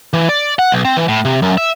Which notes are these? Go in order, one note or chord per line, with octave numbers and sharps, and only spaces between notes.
E3
D5
F#5
B1
C4
E3
A2
C3
F#2
E5